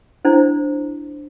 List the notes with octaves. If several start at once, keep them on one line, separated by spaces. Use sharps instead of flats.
D4 E4 C5